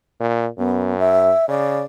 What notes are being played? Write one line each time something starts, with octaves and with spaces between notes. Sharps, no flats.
A#2
F#2 B3
E5
C#3 D5